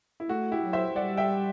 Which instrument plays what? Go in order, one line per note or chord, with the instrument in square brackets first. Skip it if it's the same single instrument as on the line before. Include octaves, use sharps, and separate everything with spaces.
[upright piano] E4
[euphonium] A3 [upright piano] F#4
[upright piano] E4 G4
[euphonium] F#3
[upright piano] C5 E5
[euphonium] G3 [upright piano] D5 F#5
[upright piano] E5 G5